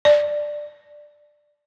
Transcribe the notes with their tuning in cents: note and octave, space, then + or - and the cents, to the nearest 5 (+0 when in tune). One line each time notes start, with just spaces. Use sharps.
D5 +10